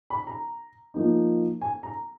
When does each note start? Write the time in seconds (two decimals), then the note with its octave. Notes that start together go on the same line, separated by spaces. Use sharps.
0.10 B5
0.27 A#5
0.94 F3 A#3 D#4
1.61 G#5
1.83 A#5